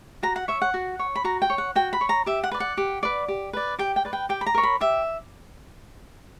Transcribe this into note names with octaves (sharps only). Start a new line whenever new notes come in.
F#4 A#5
F#5
C#5 E5
F#5
F#4
C#5
B5
F#4 A#5
G5
C#5
F#5
F#4 G5
B5
C#5
A#5
G4 E5
F#5
B4 D5
F#5
G4
B4 D5
G4
B4 D5
G4 G5
G5
B4 D5
G5
G4 G5
B5
A#5
A#4 C#5
B5
G4 E5